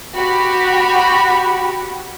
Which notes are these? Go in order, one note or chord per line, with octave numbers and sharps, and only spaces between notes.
F#4 G4 B5